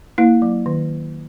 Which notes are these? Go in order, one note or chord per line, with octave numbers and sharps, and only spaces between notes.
A#3 E4
F#3
D#3